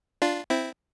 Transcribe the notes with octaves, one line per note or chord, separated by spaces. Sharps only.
D4 F4
C4 E4